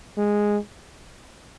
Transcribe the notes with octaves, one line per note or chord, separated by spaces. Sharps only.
G#3